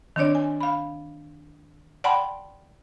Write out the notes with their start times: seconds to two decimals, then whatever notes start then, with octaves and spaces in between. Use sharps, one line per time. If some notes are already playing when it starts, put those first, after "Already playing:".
0.16 D#3 C4 D4 C#5 D5
0.35 G#5
0.61 F5 B5
2.04 D5 F#5 G5 A5 B5 C6